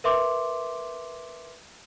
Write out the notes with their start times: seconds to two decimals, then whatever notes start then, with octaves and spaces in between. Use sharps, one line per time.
0.04 A#4 B4 E5 C6 D6